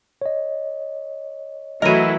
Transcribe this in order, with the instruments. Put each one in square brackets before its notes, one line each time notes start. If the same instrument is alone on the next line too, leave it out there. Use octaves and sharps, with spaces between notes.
[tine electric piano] C#5 D#5
[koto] E3 A#4 [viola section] F#3 A3 E4 [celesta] D#5 A#6 D#7